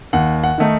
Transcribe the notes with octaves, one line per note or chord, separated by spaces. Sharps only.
D#2 F#5
F#5
D#3 A3 D#4